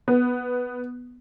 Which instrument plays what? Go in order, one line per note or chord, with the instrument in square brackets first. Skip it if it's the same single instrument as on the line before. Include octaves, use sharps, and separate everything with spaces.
[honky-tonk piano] B3